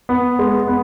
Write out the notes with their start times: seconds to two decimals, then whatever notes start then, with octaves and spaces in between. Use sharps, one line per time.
0.09 B3
0.39 G#3
0.68 B3